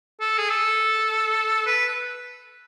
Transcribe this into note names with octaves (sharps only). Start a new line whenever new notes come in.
A4
G#4
A4
B4